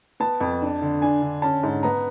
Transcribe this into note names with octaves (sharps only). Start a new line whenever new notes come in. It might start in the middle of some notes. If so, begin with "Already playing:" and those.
B3 A5
F2
D4
D3
D4 G#5
D3
C#4 A5
G#2
B3 A#5